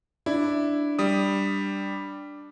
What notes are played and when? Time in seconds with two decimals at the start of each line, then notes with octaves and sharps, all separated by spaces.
0.26 D4 E4
0.99 G3 D#6